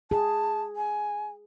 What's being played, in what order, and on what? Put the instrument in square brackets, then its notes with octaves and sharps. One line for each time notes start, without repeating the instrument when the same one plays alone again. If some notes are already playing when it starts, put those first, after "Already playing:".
[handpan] G#4 [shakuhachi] A5
[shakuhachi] G#5